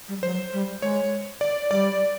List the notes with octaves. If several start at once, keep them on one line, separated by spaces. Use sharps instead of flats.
G3
F#3 C5
G3
G#3 C#5
D5
G3 D5